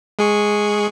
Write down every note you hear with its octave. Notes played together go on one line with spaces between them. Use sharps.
G#3 G#4 C#6